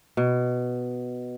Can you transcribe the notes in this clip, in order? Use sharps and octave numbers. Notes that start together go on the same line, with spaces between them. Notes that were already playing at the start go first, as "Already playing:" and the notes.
B2